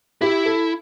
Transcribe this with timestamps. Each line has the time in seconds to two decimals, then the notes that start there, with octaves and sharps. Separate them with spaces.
0.21 E4 G4
0.45 A4